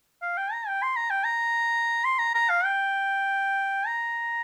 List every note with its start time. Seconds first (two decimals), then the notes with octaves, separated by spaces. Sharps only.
0.22 F5
0.37 G5
0.52 A#5
0.67 G5
0.83 C6
0.96 A#5
1.10 G5
1.24 A#5
2.05 C6
2.19 A#5
2.35 A#5
2.50 F5
2.65 G5
3.87 A#5